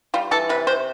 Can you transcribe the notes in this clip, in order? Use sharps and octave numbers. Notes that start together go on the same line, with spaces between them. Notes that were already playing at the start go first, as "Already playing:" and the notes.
G3 F4
E3 A4
C3 B4
C3 C5